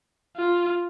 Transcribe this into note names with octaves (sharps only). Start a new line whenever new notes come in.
F4